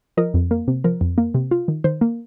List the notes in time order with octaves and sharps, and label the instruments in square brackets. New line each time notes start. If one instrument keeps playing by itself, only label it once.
[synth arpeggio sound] F3 A#4 D#5
F2
A#3
C3
F3 A#4
F2
A#3
C3
F4
D#3
D#3 C5
A#3